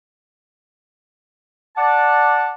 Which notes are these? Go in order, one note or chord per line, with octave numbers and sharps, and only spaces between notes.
D5 F#5 A5